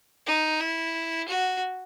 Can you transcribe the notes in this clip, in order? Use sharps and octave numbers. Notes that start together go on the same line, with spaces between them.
D#4
E4
F#4